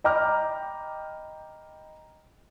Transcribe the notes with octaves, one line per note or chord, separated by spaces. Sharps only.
D#5 G5 A#5 B5 D6 F6